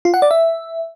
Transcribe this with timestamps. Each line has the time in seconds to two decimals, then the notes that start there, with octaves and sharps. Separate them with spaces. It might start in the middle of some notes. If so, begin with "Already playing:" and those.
0.05 F4
0.14 F#5
0.22 D5
0.31 E5